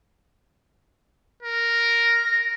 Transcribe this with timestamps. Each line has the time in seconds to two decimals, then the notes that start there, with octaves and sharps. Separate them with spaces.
1.43 A#4
2.05 A#6